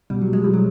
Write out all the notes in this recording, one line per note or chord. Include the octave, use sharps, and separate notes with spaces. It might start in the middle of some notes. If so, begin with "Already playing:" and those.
B2 G3
F#3
B2
G#3
F3 G3
F#3